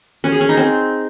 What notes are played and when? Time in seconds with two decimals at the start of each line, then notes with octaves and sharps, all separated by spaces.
0.24 C#4
0.32 G#4
0.41 C#4
0.49 D#4
0.57 C4